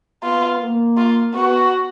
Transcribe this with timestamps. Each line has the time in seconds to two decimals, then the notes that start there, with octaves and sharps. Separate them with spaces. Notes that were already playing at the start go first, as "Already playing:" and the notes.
0.23 B3 F4
0.60 A#3
0.97 F4
1.34 B3 F#4